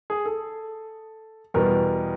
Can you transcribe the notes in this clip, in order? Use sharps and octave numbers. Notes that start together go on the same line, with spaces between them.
G#4
A4
E2 B2 G3 A#4